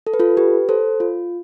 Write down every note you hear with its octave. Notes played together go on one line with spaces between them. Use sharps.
A4
B4
F4 A4
G4 B4
A4 C5
F4